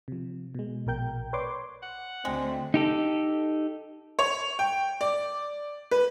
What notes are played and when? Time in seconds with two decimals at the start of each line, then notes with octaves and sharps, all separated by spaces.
0.08 C3 F3
0.55 B2 G#3
0.87 A#1 B2 A#4 G5 G6
1.33 B4 C#5 D5 C6 D6
1.82 F#5
2.25 D2 G#3 A3 C4
2.74 D#4 G4 A4
4.19 C#5
4.59 G5
5.01 D5
5.91 B4